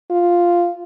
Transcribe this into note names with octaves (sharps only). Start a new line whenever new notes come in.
F4